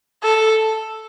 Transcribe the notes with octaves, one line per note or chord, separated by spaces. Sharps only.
A4